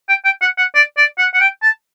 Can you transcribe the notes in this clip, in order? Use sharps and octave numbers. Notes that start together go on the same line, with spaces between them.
G5
G5
F#5
F#5
D5
D5
F#5
F#5
G5
A5